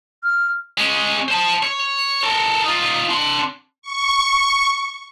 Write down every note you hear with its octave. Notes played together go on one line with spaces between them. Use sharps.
F6
G#3 C#4
C5 A5
C#5
A4 A#4
D#4 F4
D4 C6
C#6